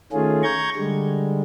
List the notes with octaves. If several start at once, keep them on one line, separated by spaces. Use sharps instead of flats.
D#3 A3 C#4 F4 G#4
A#5 C#6 G6 G#6
D3 G3 G#3